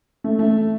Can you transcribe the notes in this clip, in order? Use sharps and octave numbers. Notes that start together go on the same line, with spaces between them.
A3
A3